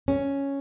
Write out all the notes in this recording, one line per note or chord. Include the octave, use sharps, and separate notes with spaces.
C#4